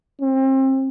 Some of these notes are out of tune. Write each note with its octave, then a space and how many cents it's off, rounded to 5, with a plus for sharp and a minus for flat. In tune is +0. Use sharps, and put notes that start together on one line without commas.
C4 +30